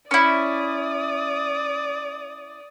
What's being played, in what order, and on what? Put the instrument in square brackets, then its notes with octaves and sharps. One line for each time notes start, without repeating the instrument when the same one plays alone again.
[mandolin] C#4 E4 [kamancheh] D5 D#6